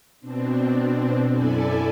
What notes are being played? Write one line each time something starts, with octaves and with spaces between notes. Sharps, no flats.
B2 C4 D4
F#2 E4 A4 D5 G#5